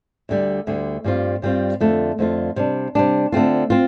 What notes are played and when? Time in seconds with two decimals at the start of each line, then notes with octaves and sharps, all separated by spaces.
0.29 D2 D3 G3
0.67 D2 D3 G3
1.04 G2 G3 C4 F4
1.42 G2 G3 C4 F4
1.80 F2 D3 A3 F4
2.19 F2 D3 A3 F4
2.56 C3 G3 D4
2.95 C3 G3 D4
3.32 D3 A3 C4 F4
3.70 C4 F4